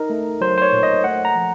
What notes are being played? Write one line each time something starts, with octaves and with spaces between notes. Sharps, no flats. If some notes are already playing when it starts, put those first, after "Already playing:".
Already playing: D#4 A#4
A3
F#3 C5
C5
C#5
A#2
D#5
A3 F#5
A#5
F3